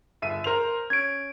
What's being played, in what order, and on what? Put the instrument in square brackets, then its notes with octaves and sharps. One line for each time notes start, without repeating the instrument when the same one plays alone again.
[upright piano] G1 E5 D#7
A#4 C5 F7
[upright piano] C#4 [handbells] G#6 D7